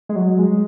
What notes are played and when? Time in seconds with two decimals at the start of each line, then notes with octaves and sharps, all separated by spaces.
0.09 G#3
0.16 F#3
0.39 G#3